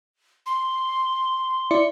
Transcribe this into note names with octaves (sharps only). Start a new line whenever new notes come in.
C6
E4 D5 C#7